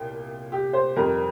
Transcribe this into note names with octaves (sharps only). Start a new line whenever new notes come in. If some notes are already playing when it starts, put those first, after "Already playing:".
Already playing: C2 A#2 G5
G4
C5
F2 D#3 G3 A#4